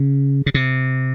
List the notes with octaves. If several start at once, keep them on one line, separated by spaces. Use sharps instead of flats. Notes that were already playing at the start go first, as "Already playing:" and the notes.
Already playing: C#3
C#3
C3